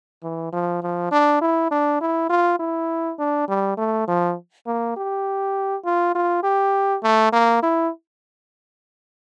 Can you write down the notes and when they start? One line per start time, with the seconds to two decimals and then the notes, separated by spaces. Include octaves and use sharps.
0.23 E3
0.53 F3
0.83 F3
1.12 D4
1.42 E4
1.71 D4
2.01 E4
2.30 F4
2.59 E4
3.19 D4
3.48 G3
3.78 A3
4.08 F3
4.66 A#3
4.96 G4
5.85 F4
6.15 F4
6.43 G4
7.03 A3
7.33 A#3
7.62 E4